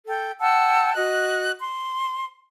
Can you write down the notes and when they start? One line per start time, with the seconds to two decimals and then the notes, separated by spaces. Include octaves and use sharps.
0.07 A4 G5
0.40 F#5 G5 A5 E6
0.94 F#4 D#5 F#6
1.60 C6